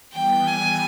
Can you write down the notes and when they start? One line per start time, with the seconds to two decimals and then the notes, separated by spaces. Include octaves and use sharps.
0.13 E3 G3 B3 G5
0.47 G#5